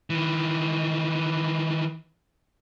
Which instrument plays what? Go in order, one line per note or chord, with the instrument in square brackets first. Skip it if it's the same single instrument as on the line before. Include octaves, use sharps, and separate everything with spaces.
[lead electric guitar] D#3 E3